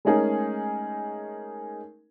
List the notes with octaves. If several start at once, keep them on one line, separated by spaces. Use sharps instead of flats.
G#3 A3 C#4 D#4 G#4 A#4